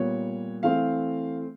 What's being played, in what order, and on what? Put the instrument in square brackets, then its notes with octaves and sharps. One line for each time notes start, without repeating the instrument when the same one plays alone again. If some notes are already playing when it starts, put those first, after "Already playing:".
Already playing: [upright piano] A#2 G3 B3 C#5
E3 A3 C4 F5